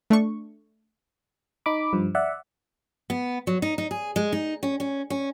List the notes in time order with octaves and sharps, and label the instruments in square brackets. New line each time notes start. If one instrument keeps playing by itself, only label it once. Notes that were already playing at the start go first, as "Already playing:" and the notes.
[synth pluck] A3 D4 C#6
[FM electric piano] D#4 B5 D6
G2 F3
D5 E5 F#5
[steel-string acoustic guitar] B3
F#3
D#4
D#4
G#4
G#3
D#4
C#4
C#4
C#4